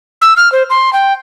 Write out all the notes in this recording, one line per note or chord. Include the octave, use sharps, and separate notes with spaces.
E6
F6
C5
C6
G5